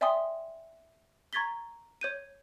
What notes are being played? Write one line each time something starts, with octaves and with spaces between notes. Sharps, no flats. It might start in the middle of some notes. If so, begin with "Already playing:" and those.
D5 E5 G5 G#5 C6 D#6
A#5 C#6 G#6 A6 B6 G7
C#5 G6 D#7